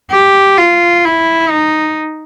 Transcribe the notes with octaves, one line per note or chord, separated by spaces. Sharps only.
G4
F4
E4
D#4